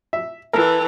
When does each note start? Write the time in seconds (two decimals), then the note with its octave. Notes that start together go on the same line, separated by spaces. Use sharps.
0.13 E5
0.53 E3 A4 A#4